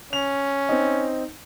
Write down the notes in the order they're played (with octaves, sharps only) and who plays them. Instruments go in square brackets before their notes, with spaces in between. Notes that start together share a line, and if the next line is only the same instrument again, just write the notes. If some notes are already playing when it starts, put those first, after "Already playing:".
[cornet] C#4 [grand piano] F7
[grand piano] C4 D#4